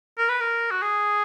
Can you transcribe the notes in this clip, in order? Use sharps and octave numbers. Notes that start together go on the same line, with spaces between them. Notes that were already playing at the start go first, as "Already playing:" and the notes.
A#4
B4
A#4
F#4
G#4